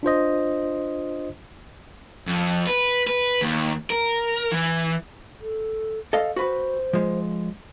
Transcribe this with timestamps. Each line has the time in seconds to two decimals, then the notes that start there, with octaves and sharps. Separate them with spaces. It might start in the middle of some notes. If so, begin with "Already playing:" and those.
0.03 D4 F4 C5 D#5
2.27 F2
2.67 B4
3.07 B4
3.41 D#2
3.90 A#4
4.52 E3
5.41 A4
6.13 A4 D#5 F5
6.36 F#4 B4 C5 B5
6.93 F3 G#3